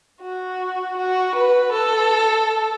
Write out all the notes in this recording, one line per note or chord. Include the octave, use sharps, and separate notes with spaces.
F#4
F#4
B4
A4